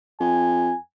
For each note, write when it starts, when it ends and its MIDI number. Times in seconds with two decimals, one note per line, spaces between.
0.20 0.71 41
0.20 0.78 80